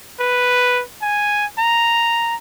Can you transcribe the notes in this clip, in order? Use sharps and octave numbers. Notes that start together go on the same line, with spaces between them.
B4
G#5
A#5